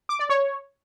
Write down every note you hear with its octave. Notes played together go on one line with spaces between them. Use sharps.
D6
D5
C#5